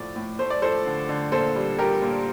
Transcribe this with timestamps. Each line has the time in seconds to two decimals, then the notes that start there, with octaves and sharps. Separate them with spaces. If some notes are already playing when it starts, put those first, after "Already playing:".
Already playing: A2 F3 A3 D5
0.16 A2
0.39 A3 C5
0.50 D5
0.62 F3 A4 C5
0.86 D3
1.09 D3
1.32 A#2 A4 C5
1.56 G3
1.79 G3 G4 A#4
2.02 A#2